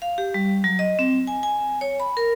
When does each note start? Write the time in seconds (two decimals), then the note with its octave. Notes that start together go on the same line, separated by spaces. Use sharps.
0.02 F5
0.18 G4
0.34 G3
0.64 F#3
0.79 D#5
0.99 C4
1.27 G#5
1.43 G#5
1.81 C#5
2.00 B5
2.17 A#4